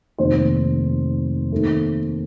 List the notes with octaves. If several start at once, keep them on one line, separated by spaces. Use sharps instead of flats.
F1 D#2 D#3 C5
D#2 D#3 A3